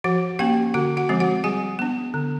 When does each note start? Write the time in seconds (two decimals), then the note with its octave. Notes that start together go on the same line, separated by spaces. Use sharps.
0.04 F3 F#4 F#5
0.39 A#3 C#4 G4 G5
0.74 D3 F#4 F#5
0.97 F#4 F#5
1.09 F3 G#3 C4
1.20 F#4 F#5
1.44 G3 G#4 G#5
1.79 B3 D4
2.14 D3